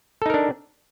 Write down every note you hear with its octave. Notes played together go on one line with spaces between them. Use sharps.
D4 D#4 A4 A#4